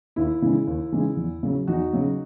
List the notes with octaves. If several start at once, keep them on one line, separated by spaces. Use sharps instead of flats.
D#2 E4
C#3 E3 G#3
D#2
C#3 E3 G#3
E2
C#3 F#3
E2 D#4 F#4
C#3 F#3